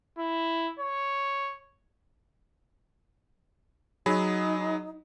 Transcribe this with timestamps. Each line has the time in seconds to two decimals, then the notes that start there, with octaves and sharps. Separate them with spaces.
0.19 E4
0.80 C#5
4.06 F#3 D#4 G#4 B5